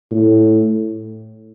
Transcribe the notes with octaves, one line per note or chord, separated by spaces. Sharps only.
A2